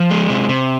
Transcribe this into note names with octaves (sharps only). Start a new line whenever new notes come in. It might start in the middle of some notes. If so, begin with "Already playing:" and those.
Already playing: F3
G#3
C3
C3